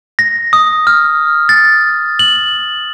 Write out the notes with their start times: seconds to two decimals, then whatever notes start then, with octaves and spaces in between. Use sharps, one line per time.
0.19 A#6
0.53 D#6
0.87 F6
1.49 A6
2.19 F#7